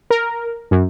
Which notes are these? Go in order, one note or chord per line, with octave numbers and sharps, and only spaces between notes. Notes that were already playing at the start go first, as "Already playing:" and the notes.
A#4
F#2